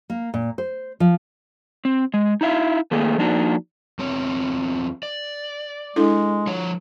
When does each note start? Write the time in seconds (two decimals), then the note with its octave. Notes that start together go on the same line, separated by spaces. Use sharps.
0.10 A#3
0.34 A#2
0.58 C5
1.00 F3
1.85 C4
2.14 G#3
2.41 D#4 E4 E5 F5
2.91 D#3 A3 A#3 G#4
3.18 F3 A#3 D4 D#4 F#4
3.99 E2 C4 C#5
5.03 D5
5.96 G#3 D4 E4 A4
6.47 F3 C#5